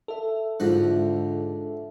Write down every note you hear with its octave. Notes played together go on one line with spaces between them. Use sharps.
A4 E5
G#2 D3 F3 F#4 F#5